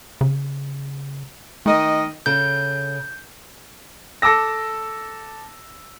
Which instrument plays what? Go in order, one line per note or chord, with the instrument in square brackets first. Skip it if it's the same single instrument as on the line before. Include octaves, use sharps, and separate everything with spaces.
[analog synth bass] C#3
[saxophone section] D#3 D#5 [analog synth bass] A3
[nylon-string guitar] C#3 A4 [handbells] G6
[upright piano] A4 A5 D6 E6 A#6